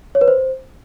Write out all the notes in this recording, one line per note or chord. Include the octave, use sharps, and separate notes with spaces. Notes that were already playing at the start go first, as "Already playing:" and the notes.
C#5
B4
C5